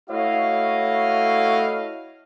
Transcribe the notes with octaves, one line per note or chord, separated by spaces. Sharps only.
A3 E4 F#4 C#5 D#5 F5